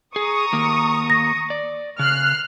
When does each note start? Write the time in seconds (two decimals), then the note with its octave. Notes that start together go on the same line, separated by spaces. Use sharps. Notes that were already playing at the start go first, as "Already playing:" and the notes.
0.16 G#4 A#5 C#6 D#6
0.53 D#2 A#3
1.10 A#6
1.50 D5
1.99 C#3 F6 F#6 C7